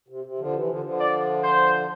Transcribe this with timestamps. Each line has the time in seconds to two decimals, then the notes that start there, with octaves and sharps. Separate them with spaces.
0.08 C3
0.24 C3
0.39 D3 F3
0.53 C3 E3
0.69 D3 F3
0.83 D3 F3
0.99 D5
1.43 C5